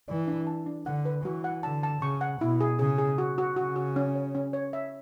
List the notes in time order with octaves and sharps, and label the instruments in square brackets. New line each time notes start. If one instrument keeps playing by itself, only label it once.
[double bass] E3 [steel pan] D5
[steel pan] D4
A5
D4
[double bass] D3 [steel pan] F#5
[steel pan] B4
[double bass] E3 [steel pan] F#4
[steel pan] F#5
[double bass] D3 [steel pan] A5
[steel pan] A5
[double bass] C#3 [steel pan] C#6
[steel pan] F#5
[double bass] B2 [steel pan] E4
[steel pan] G#4
[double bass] C#3 [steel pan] G#4
[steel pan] G#4
F#4
F#4
[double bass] C#3 [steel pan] F#4
[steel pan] F#4
C#4
C#5
C#4
C#5
E5